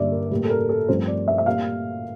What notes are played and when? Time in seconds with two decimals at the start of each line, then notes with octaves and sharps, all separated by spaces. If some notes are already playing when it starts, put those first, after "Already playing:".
Already playing: G2 D3 G3 A#3 D5 E5
0.12 A#4
0.31 A2 G3 A#3 A#4
0.45 A4
0.50 A#4
0.69 A4
0.88 G2 F3 A3 C4 C5
1.07 D5
1.28 E5
1.38 E5
1.46 A#2 G3 A#3 F5